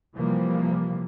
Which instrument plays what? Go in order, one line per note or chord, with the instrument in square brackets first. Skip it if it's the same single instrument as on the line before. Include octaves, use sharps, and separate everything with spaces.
[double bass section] C3 E3 F3 G3 A#3